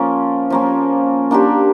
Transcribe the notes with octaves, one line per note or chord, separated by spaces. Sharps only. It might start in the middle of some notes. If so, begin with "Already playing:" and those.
Already playing: F3 A#3 C#4
F3 A#3 C#4
A#3 D4 G4 C5